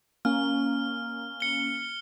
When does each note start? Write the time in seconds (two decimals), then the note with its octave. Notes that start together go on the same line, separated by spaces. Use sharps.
0.25 A#3 C#4 F6
1.40 C#7 G7